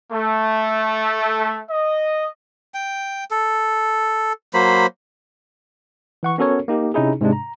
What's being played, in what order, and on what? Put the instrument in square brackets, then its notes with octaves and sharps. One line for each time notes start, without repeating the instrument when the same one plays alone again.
[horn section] A3
D#5
[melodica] G5
A4
F#3 A#3 C5 B5
[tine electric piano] E3 F#5 C#6
B3 C#4 F#4 A4 A#4 C#5
A#3 D#4 G4
C3 C#4 D#4 E4 G#4
G#2 C3 G#3 D4
A#5